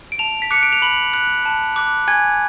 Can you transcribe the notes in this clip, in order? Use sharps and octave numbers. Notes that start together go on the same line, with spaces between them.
D7
A5 F7
B6
D6 F#6 C#7
D7
F7
B5 F#7
F#6
A5
D6 F#6
G#5 G#6